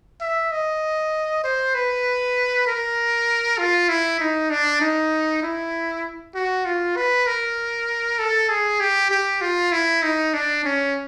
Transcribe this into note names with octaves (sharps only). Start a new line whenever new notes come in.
E5
D#5
C5
B4
A#4
F4
E4
D#4
D4
D#4
E4
F#4
F4
B4
A#4
A4
G#4
G4
G4
F4
E4
D#4
D4
C#4